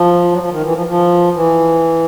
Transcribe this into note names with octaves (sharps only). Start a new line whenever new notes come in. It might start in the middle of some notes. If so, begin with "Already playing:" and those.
Already playing: F3
F#3
F3
D#3
E3
F3
F3
E3